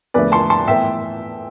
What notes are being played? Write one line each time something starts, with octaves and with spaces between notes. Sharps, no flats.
E2 D3 F3 A3 B4 D5
A5 C6
A5 C6
A2 E3 B3 E5 G5